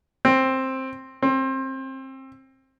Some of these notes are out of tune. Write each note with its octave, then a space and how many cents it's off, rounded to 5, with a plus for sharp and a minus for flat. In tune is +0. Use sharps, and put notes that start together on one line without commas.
C4 +10
C4 +25